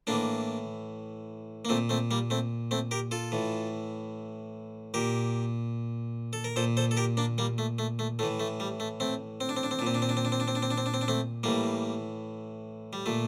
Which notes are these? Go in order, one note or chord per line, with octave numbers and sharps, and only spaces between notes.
A2 E3 A#3 D4
A#3
A#2 A3 C4
A3 C4
G3 A#3
A3 C4
A3 C4
G4 A#4
F4 A4
A2 E3
A#2 G4 A#4
A4
A#4
A#2 A4 C5
A4 C5
A4
G4 A#4
A#3 D4
G3 A#3
A3
A3
A3
A2 E3 A3
A3
G3
A3
A3 C4
C4
D4
C4
D4
C4
D4
A#2 C4
D4
C4
D4
C4
D4
C4
D4
C4
D4
C4
D4
C4
D4
C4
D4
A3 C4
A2 E3 G3 A#3
G3
A#2 A3